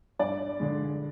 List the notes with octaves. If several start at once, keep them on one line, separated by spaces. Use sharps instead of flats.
G2 D5
D3 G#3